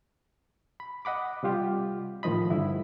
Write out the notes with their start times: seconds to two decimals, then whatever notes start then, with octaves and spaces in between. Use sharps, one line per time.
0.80 B5
1.05 D#5 F#5 B5 D6
1.43 C3 G3 F4 G4
2.23 A2 D#3 F3 D#5 B5
2.50 G2 D3 E4